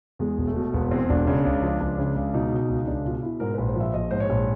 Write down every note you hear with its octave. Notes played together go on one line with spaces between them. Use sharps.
E2 G#3
E1
A3
B2
E1 B3
E2 C4
E1 D4
C#3
C#2
F3
C#2
C#3
C#2
B2 D#4
B2
C#2
C#2 D4
B2 F4
B2 E4
G#2 A#4
A#1 B4
C5
F3 E5
A#1 D#5
G#2 C5
C#5
A#1